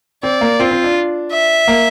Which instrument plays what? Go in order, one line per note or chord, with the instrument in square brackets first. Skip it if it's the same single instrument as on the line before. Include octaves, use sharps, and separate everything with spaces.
[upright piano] C4 [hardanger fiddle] D5
[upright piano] A#3
[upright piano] C4 [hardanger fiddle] F4
[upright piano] C4
D4
[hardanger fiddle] E5
[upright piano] A#3